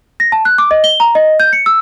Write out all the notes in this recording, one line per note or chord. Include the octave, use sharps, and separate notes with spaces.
A#6
A5
F#6
D6
D#5
G7
A#5
D#5
G6
C#7
E6